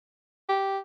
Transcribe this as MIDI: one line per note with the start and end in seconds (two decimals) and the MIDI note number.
0.49 0.78 67